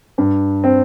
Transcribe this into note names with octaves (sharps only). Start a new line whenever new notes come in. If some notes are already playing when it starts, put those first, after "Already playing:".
G2
C4